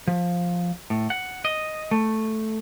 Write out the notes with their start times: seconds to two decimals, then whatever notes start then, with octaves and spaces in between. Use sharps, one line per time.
0.08 F3
0.90 A2
1.10 F#5
1.45 D#5
1.91 A3